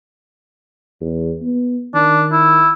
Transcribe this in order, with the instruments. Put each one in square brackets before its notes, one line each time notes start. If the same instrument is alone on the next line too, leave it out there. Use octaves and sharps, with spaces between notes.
[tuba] E2
B3
[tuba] D#3 [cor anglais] D4
[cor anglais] E4